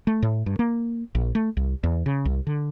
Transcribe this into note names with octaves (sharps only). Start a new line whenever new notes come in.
A3
A2
G2
A#3
A#1
A3
C2
E2
C#3
C2
D3